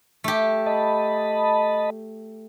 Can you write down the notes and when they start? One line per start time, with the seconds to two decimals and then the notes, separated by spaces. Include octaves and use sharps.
0.24 A3 G4
0.66 D#5 A5 B5